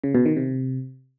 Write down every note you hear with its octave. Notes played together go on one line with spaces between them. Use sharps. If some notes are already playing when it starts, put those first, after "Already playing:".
C#3
B2
D#3
C3